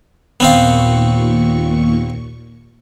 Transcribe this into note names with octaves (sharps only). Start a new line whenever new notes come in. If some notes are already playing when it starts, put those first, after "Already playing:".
D#2 A#2 B3 C4 F5 C#6